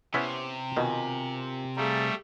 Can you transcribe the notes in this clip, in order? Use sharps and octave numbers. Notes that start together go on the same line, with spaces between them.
C3 B3 C#4 E4
B2 D#3 F4 A#4 G#5
G3 A3 G#4 F5 A#5